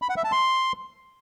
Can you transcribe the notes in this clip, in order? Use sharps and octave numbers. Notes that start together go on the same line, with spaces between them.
B5
F#5
E5
A5
C6